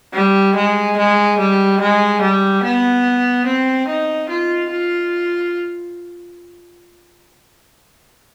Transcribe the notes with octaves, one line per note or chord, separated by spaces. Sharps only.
G3
G#3
G#3
G3
G#3
G3
B3
C4
D#4
F4
F4